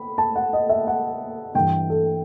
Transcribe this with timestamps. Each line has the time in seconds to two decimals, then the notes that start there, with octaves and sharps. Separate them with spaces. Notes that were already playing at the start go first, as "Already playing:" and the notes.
Already playing: B5
0.18 A5
0.36 F#5
0.53 D#5
0.69 E5
0.87 F#5
1.55 G2 E3 G5
1.90 A4